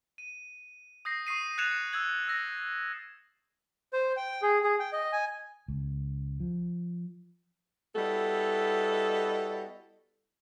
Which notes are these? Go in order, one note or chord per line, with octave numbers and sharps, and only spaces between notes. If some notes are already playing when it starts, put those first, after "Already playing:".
D#7
D#6 G6 A#6 C7
C#6 D#6 C7 D#7
F#6 G#6 A6 C#7 E7 F7
E6 G6 G#6 F#7
E6 A6 A#6
C5
G5
G#4
G#4
G5
D#5
G#5
C#2
F3
G3 B3 E4 F#4 A4 D#5